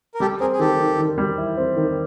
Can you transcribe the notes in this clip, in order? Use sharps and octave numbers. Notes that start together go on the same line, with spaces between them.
A#4
G3 G4 A4
C4 G#4 A#4
G#4
D#3 G4 A4
D#3
D#3
G3
E4
C4
D#3